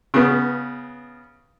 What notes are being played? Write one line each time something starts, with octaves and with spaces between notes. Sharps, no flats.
C#3 B3